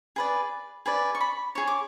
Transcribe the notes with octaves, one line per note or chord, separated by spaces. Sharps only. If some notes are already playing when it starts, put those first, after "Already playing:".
G#4 B4 D5
G#4 B4 D5
C#6
B5
G#4 C#5 C#6
D6